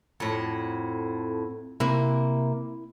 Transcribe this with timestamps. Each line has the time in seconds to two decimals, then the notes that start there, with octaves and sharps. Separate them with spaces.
0.20 F2 A2 F#5
1.80 C3 A#3 E4